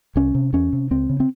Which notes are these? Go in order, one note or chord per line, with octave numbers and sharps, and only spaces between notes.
C2 C#4
C3
E2 C#4
C3
C#2 C4
C#3
C4